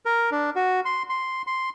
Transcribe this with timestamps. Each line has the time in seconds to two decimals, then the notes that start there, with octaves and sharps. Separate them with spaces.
0.05 A#4
0.31 D4
0.56 F#4
0.85 C6
1.10 C6
1.47 C6